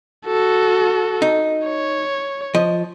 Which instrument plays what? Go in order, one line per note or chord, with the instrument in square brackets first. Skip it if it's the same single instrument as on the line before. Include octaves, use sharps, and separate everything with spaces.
[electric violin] F#4 A4
[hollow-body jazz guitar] D#4
[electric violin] C#5
[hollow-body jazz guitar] F3 D#5